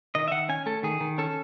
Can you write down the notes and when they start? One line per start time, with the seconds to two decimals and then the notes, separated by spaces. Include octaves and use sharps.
0.15 D#3 D#5
0.28 E5
0.31 D#3 F#5
0.49 C#4 G#5
0.66 A3 A4
0.83 D#3 G#4
1.01 D#3
1.18 C#4 A4